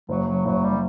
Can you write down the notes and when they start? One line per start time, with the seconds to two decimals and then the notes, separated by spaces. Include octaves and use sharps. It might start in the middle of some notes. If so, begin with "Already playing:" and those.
0.09 F#1 F#3
0.27 F#3
0.45 F#1 F#3
0.64 G3